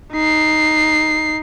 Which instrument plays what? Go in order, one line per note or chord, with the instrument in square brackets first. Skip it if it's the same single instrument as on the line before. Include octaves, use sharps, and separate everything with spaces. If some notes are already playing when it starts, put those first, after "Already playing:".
[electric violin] D#4 C7